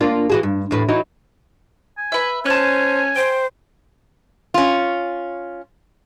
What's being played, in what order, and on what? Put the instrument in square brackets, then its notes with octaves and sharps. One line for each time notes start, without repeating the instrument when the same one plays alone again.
[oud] A#3 D4 F4
E3 F#4 G#4
G2
E2 A2 B4
E3 F#3 D#4
[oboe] G#5
[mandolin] B4 E5
[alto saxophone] C#4 [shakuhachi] C5 [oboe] G#5 [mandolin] A5 F#6
[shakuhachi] C5 [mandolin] G5
[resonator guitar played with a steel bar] C#4 F4